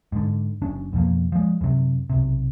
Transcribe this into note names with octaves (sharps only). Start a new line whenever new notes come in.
G#2 D3
F#1 C#4 D4
F2 B2 F3 A#3
F3 G#3
F#2 C3
B1 C3